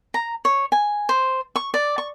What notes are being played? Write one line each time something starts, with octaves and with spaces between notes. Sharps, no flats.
A#5
C#5
G#5
C5
C#6
D5
C#6